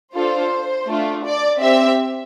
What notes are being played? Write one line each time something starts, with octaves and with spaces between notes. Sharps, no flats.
D4 F4 A4 C5
A3 D4 F4
D5
C4 G4 E5